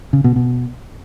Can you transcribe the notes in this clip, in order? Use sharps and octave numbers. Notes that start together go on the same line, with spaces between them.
C#3
B2
B2